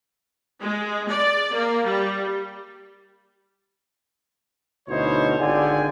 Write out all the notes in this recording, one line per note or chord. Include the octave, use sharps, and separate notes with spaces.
G#3
D5
A#3
G3
D2 B2 D#4 E4 C5 C#5
G#1 D3 F4 G#4 G5 G#5